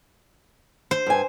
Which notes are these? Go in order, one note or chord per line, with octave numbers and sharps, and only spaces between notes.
C5
G2 G#5